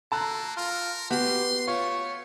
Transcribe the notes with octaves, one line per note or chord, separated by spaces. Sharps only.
A#3 A4 A5 A#5 F#6
F4 A#4
B3 F#4 G4 C6
A3 F4 C#5